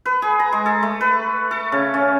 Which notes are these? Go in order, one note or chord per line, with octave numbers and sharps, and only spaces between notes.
B4
G#4
A#5
G#3
A4
A3
B4
A4
C#3
C#4